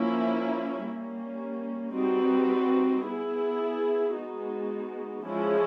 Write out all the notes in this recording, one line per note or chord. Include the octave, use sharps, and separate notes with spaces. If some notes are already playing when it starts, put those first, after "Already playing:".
Already playing: F3 A#3 C#4 E4
G3 A#3 C#4
G3 C4 D#4 F#4 B4
B3 E4 G#4
G#3 B3 D#4 F#4
F3 G#3 C#4 E4 G#4